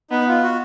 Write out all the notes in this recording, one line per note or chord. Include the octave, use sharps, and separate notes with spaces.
B3 D#4
F4
F#4